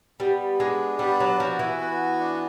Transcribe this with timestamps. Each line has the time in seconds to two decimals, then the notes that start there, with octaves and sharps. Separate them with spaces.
0.20 G3 B3
0.60 G#3 D4
0.99 G3 B3
1.20 F#3
1.40 F3 F#4
1.59 E3
1.80 B3
2.20 D4